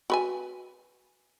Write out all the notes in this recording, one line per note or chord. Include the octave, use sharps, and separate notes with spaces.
F#4 B4 G#5